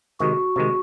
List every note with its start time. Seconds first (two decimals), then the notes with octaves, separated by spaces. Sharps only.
0.20 C3 D#3 G#3 F#4
0.56 C3 D#3 G#3